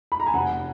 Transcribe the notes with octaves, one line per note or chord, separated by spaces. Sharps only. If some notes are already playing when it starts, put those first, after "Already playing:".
B5
A#5
G#5
F1 F#5